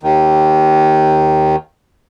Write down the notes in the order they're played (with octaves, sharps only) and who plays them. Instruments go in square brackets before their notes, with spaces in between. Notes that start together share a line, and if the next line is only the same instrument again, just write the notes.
[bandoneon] D#2 D#3